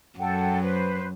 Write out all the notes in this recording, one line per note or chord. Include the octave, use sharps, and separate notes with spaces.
F#2 A4 F#5 G5
B4 C5